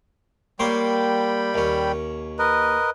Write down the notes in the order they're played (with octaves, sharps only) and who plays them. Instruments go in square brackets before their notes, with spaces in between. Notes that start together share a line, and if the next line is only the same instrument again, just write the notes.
[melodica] G3 G5 B5 [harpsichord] A#3 C#5 C6
[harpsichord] D#2 C#4
[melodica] A#4 B4 D#5